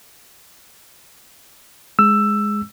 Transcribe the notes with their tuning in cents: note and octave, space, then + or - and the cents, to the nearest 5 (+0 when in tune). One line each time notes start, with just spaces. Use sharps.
G#3 +0 E6 +10